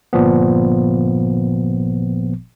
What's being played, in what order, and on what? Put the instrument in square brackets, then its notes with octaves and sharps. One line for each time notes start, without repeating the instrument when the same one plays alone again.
[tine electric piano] G1 A#2 F3 B3